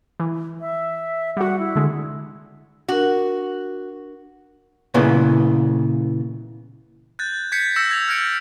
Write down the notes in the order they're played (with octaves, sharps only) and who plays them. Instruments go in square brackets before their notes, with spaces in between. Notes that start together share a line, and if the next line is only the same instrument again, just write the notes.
[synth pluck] E3
[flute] E5
[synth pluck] G3 F#4 [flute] F#5
[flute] E4
[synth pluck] D3 G#3
[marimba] D4 A#4 [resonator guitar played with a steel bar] F#4
[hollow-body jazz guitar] A#2 C#3 E3 B3
[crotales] F#6 G6 A6
G6 G#6 B6 C#7
E6 G6 A6 A#6 C#7 E7
G#6 F7
E6 F6 G#6 A#6 C#7 D7